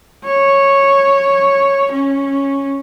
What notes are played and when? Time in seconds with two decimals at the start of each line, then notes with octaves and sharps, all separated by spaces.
0.25 C#5
1.92 C#4